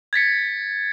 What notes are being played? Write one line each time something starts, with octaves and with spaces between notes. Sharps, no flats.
G#6 A6 B6 C#7